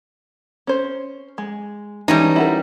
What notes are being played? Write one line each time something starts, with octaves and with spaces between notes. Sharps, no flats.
C#4 C5
G#3
E3 G3 G#3 C#4 D#4 A5
E4 F#4 A#4